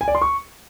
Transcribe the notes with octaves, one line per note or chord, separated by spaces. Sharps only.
G#5
D5
C6
C#6